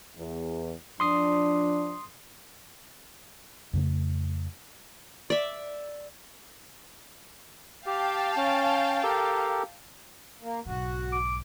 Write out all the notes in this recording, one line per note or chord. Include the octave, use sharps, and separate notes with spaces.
E2
F3 D4 C6 D#6 C7
F2 C#3 A3
D5 E5
G4 F5 G5 A5
C#4
G4 A4 A#4
A#3
B1 G#2 F#4
D6